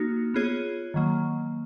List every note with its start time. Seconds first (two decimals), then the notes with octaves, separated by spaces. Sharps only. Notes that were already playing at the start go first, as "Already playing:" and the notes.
Already playing: A#3 D#4 F#4
0.34 B3 F4 G#4 C#5
0.94 D#3 F#3 A#3